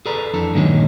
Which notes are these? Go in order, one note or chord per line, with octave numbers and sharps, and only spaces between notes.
G#4 A4 B4 D5 A#5
F2 E3 D4 A4
G2 A#2 D#3 F#3 G#3 C#4